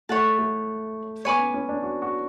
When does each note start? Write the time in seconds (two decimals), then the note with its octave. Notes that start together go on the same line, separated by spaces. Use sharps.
0.09 A3 C#5 F#5 A5
0.39 A3
1.25 B3 C#5 G#5 B5 D6
1.39 C#4
1.54 C#4
1.69 D4
1.83 F#4
2.02 F#4